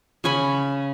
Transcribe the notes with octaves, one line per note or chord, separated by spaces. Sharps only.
C#3 C#5 G#5 B5